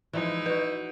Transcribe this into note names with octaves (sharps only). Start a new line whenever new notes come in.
E3 F3 G#3 D#4 E4
B3 F#4 B4